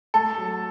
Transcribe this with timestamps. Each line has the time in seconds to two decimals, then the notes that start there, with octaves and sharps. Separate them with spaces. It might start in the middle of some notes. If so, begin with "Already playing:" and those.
0.14 A3 A4
0.38 F#3